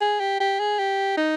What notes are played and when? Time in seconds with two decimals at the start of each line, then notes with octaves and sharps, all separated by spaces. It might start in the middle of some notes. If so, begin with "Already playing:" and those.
0.01 G#4
0.20 G4
0.40 G4
0.60 G#4
0.79 G4
1.17 D#4